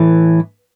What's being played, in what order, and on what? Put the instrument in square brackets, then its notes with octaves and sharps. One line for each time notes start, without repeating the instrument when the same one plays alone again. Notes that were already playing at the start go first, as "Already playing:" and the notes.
Already playing: [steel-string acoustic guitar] A2 E3